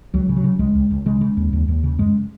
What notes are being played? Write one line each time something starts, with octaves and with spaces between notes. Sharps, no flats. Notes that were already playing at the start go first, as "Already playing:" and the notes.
C#2 F#3
C#3
F#3
C#3
C#2 G#3
C#2
C#2
C#3 G#3
C#3
D#2
D#2
D#2
C#3
F#2 G#3